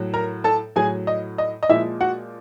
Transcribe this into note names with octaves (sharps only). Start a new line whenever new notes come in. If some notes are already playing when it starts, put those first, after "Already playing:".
Already playing: A2 F#3
A#4 A#5
A4 A5
A2 F#3 G#4 G#5
D#5
D#5
D#5
A#2 F3 G#3 E4 E5
F#4 F#5